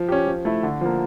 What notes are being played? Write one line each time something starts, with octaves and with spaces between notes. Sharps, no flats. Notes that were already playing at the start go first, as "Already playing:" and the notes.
Already playing: F3
C#4 G4
F3
A3 E4
D3
F3 A#3